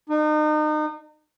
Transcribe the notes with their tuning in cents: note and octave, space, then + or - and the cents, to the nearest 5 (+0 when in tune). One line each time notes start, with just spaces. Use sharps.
D#4 -35